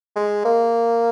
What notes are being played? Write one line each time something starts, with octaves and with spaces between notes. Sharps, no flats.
G#3
A#3